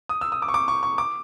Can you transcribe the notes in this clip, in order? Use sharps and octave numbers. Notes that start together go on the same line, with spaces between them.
D#6
E6
D#6
D6
C#6
D6
C#6
C#6
D6